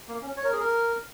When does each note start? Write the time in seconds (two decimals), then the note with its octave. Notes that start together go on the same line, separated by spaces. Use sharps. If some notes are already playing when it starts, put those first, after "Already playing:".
0.08 A#3
0.22 C#4
0.37 C#5
0.44 A#4
0.52 G#4
0.59 A#4